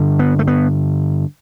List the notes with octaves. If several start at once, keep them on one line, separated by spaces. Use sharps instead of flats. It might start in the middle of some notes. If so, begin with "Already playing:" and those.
Already playing: G2 D3
B3
A3
B3